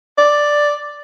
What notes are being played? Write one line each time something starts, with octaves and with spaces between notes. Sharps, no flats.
D5